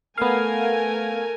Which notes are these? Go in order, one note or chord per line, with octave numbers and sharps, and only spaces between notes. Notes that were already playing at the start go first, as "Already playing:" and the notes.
A3 B3 A#4 F5 G#5